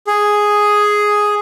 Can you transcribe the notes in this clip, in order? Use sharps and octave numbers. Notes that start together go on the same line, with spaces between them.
G#4